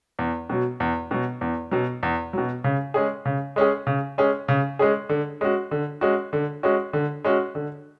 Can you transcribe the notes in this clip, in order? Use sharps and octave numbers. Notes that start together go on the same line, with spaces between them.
E2
B2 F#3
E2
B2 F#3
E2
B2 F#3
E2
B2 F#3
C#3
G#3 C#4 G#4
C#3
G#3 C#4 G#4
C#3
G#3 C#4 G#4
C#3
G#3 C#4 G#4
D3
G#3 C#4 F#4
D3
G#3 C#4 F#4
D3
G#3 C#4 F#4
D3
G#3 C#4 F#4
D3